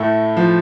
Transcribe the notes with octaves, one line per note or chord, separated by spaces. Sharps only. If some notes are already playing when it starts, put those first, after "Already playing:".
Already playing: A2 A3
F3